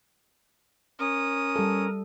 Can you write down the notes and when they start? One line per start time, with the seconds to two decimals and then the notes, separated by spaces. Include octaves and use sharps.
0.99 C#4 A#4 D#6
1.56 G3 A4